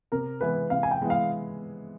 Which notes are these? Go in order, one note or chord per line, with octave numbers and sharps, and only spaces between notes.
C3 A#4
E3 G#3 B3 E4 B4
C3 F5
G#5
G5
E3 G#3 B3 E4
F5